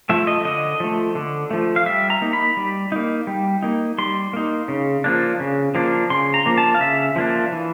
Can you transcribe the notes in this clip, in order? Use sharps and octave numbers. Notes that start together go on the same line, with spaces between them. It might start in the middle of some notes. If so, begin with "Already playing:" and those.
F3 A3 E5
D#5
D3 D#5
F3 A3
D3
F3 A3
F5
G3 E5
A#5
A#3 D#4
B5
G3
A#3 D#4
G3
A#3 D#4
G3 C6
A#3 D#4
C#3
F3 A#3 D4
C#3
F3 A#3 D4
C#3 C6
A#5
F3 A#3 D4
A5
F5
C#3 E5
F3 A#3 D4
E3